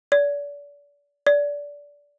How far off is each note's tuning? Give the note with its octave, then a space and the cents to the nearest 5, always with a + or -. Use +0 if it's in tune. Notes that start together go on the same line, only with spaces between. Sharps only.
D5 -35
D5 -20